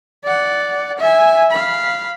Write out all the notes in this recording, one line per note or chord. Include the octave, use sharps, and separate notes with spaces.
D5 F#5
E5 G#5
F5 B5